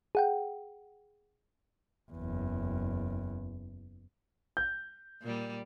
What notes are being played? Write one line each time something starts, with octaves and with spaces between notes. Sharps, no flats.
G#4 F#5 G5
F#1 E2
G6
A#2 G3